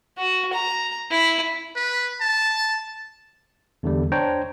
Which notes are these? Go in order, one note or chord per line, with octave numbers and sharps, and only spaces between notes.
F#4
A#5
E4
B4
A5
E2 D3 G3
D4 C5 C#5 G5 A#5